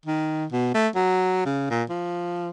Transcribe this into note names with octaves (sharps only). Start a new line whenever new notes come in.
D#3
B2
A3
F#3
C#3
A#2
F3